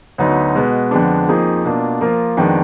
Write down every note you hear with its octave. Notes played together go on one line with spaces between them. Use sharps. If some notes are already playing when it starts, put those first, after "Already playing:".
D2 D3 F#3 B3 D#4
B2 G#3 B3
F2 D3 G#3 B3 D4
F2 F3 A#3 D#4 G#4
B2 A#3 D4 F4
F3 A#3 F4 A#4
F2 D#3 G#3 B3 D4